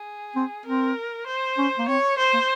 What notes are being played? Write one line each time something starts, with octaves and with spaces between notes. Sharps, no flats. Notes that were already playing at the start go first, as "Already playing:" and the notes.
Already playing: G#4
C4
C4 A#4
C5
C#4
A#3
C4 C#5
C5
A#3